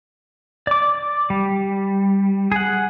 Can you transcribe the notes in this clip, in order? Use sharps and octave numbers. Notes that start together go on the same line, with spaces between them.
D5 D6
G3
G#4 F#5